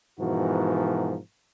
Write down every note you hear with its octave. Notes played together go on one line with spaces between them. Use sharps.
G#2 B2 E3 F3 F#4 A#4